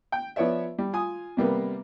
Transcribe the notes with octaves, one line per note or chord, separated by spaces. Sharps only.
G5
F3 B3 C#5 D5 E5
G3
F4 G#5 D#6
C3 G3 A#3 B3